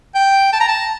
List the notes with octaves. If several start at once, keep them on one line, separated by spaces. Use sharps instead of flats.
G5
A5
A#5
A5